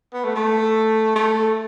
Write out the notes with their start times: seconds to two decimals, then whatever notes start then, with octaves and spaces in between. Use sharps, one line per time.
0.13 B3
0.24 A3
0.36 A3
1.16 A3